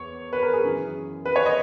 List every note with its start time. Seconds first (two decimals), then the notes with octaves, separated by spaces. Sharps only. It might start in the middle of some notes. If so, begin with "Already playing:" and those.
Already playing: E2 C#5
0.33 B4
0.43 A#4
0.53 G#4
0.63 F#2 C#3 E3
1.25 B4
1.36 C#5
1.46 D#5